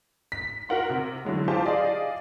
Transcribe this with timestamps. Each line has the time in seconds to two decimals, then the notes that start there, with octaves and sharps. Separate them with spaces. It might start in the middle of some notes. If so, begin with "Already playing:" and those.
0.32 B6
0.69 F#4 A#4 F#5 C6
0.90 C3
1.25 D3 E3 F#3 G#3
1.48 F4 G4 G#4 C5 A5
1.66 G#4 D5 D#5 F5